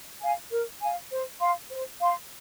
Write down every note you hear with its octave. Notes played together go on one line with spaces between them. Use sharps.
F5 G#5
A#4
F5 G#5
C5
F5 C6
C5
F5 C6